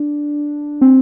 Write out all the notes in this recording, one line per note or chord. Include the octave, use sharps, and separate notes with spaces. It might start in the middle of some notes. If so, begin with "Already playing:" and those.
Already playing: D4
C4